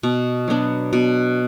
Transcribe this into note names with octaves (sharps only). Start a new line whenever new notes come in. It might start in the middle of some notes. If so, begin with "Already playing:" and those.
B2
F#3 B3 D4
B2